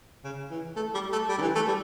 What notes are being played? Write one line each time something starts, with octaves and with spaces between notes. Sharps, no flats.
C#3
E3
A3
G3
A3
G3
D3
E3
A3
G3